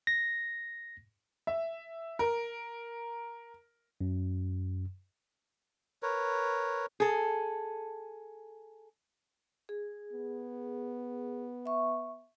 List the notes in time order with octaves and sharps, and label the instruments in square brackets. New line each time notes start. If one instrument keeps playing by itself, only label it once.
[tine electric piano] A#6
[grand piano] E5
A#4
[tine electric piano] F#2
[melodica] A#4 B4 C#5
[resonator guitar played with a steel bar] G#4 A4
[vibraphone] G#4
[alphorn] B3
[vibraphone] E5 C#6